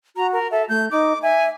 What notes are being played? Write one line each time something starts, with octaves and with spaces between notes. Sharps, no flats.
F#4 A#5
A#4
A4 E5
A3 G6
D#4 D6
E5 G#5